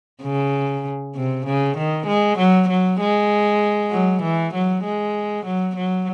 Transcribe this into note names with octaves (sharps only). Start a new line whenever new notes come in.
C#3
C3
C#3
D#3
G#3
F#3
F#3
G#3
F#3
E3
F#3
G#3
F#3
F#3